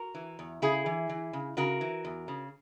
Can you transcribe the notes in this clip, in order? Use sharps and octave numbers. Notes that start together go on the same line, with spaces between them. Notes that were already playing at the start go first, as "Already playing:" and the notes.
Already playing: F#4 A#4
E3
E2
C#3 E4 G#4
E3
E3
C#3
C#3 F#4 A#4
E3
E2
C#3